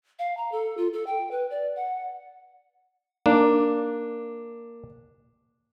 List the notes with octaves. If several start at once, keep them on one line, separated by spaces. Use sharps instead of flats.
F5
A#5
A4
F4
A4
G5
B4
D5
F#5
A#3 D4